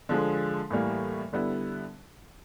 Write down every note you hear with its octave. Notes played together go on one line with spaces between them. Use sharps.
D3 F3 G#3
A2 E3 G3 A#3
D3 G3 B3 E4